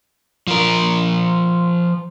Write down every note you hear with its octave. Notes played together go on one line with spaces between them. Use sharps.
F3 A#4